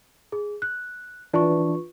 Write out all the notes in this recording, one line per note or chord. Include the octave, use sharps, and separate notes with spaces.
G#4
F#6
E3 D4 F4 B4 C#6